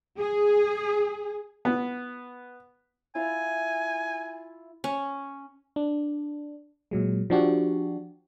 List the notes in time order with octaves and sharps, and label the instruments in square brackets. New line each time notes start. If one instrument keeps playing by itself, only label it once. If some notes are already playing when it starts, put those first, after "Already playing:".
[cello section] G#4
[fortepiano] B3
[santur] E4 F4 F5 [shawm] G#5
[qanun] C#4
[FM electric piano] D4
A#2 F#3 G#3
F3 D4 F#4 G4